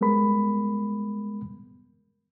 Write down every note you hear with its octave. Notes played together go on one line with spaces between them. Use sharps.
G3 G#3 B3 A#4 B5